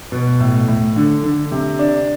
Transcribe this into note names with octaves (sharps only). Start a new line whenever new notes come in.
B2
A2
A2
D3
D3
C3
D4